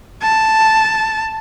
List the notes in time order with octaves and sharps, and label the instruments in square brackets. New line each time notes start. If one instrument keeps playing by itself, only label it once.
[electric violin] A5